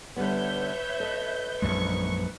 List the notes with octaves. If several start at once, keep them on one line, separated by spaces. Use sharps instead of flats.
D3 G3 B3 B4 C#5 E5 G6
A4 D#5
A#1 F#2 G#3 C#6